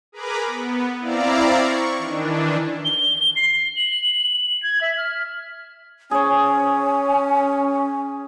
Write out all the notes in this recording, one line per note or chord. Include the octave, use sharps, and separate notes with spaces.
G#4 A#4 B4 A#5 B5 D6
B3
C4 E4 D5 F5 A#5
C#6
D#3 E3 D4
G7
C7
F#7
G#6
E5
F6
C#4 G#4 C#5 G#5